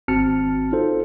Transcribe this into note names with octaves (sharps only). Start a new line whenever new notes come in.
G#1 C4 F#4 A5 F6 C#7
D#4 F4 A4 C5